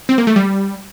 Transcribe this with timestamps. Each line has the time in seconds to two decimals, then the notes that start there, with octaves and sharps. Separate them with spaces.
0.09 C4
0.18 A#3
0.27 A3
0.36 G3